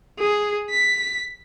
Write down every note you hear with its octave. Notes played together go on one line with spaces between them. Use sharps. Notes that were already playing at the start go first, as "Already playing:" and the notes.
G#4
B6